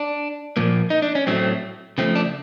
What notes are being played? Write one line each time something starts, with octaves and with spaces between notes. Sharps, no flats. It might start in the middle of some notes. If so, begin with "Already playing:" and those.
Already playing: D4
A#2 F3 A#3
D#4
D4
C#4
A2 F#3 A3 C4
C#3 F3 A3 C4
D4